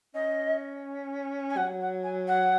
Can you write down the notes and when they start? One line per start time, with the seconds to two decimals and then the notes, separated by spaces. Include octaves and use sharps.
0.14 C#4 D#5
1.50 G#5
1.57 F#3 F#5
1.81 F#5
2.04 G#5
2.28 F#5